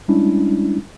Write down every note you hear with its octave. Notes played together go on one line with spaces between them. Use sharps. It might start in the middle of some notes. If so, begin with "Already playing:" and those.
G3 G#3 C#4 D4 E4